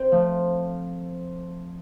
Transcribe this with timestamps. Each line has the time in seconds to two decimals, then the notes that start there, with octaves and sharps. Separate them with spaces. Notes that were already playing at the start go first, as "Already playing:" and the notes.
Already playing: C4
0.11 F3 A3